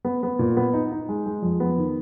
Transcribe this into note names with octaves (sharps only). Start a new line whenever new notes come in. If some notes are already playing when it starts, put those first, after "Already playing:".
B3
B3
A#2
B3
D#4
D#4
G#3
G#3
F2
B3
D#3